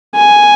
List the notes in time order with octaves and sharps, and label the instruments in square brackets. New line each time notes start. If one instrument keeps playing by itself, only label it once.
[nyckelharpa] G#5